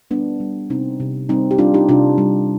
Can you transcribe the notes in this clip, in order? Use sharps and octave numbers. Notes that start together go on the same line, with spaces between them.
G3 B3 D4
G3
C3 C4 D#4
C3
G3 C4 D#4
G4
G3 D4 F4
D#4 G4
C3 D4 F4
G3